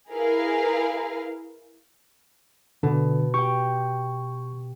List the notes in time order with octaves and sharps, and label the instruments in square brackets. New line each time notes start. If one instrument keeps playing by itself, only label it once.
[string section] E4 G#4 A#4 B4 F5
[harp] B2 [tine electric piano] D3
[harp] G4 G5 [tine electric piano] C#6